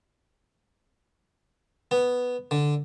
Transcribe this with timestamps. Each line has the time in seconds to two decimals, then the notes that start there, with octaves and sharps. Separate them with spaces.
1.91 B3
2.51 D3